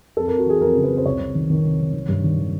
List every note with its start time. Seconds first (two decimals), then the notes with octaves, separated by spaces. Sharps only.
0.17 F2 A4
0.27 A#4
0.32 F2
0.39 F#4
0.46 E3 G#4
0.61 F2 A#4
0.76 C#3
0.84 B4
0.91 F2
0.97 C5
1.05 C2 C#5
1.20 C2
1.35 D#3
1.50 D#3
1.64 C2
1.79 C2
1.94 D#3
2.08 G2
2.24 D#3
2.38 D#3